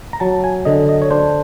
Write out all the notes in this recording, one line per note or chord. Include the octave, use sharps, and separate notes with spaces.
A#5
F#3 A5
G#5
D3 D#5
D#5
C#5
D4 C5